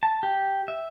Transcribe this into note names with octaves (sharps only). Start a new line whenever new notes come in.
A5
G4
E5